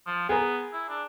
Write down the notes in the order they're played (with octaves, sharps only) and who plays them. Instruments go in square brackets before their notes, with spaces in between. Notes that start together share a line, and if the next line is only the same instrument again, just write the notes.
[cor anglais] F3
[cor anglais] B3 [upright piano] G#4 A#4
[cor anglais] E4
D4